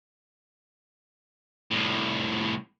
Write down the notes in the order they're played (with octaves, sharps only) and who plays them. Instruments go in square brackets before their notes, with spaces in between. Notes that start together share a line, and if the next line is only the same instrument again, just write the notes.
[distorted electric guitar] C2 A2